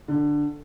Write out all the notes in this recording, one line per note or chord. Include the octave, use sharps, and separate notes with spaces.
D3